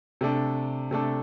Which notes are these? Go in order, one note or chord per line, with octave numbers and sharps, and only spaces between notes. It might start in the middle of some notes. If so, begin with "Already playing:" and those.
C3 A3 D4 A4
C3 A3 D4 A4